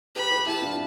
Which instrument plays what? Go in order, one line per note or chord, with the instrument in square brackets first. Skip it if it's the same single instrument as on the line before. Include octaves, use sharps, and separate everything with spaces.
[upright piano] G4 B4 [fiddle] B5
[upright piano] G4 B4
[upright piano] E4 G4 [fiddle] A5
[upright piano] D4 F4